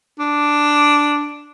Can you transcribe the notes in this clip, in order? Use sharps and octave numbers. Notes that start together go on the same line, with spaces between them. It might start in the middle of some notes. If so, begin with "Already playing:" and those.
D4